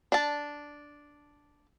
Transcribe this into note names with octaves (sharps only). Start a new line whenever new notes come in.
D4 A5